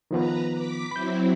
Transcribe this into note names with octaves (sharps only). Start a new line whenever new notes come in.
D#3 F3 B3 B4 A#5
D6 B6
F#3 C4 E4 B5 G6